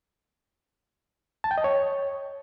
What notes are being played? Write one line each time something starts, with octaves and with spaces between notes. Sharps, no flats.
A5
G5
D#5
C#5